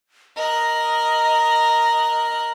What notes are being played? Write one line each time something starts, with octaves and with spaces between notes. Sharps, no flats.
A#4 D#5 F#6